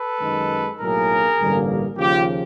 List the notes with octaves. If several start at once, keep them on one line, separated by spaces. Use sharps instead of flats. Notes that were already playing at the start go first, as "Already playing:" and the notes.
Already playing: A4 B4
F#2 D#3 G#3
B1 A2 F#3 A#3 G#4 A#4
A1 G2 D3 G3 A#3
D#2 C#3 F3 F4 G4